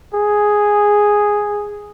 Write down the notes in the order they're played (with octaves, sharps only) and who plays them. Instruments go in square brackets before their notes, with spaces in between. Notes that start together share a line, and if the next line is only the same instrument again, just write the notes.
[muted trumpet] G#4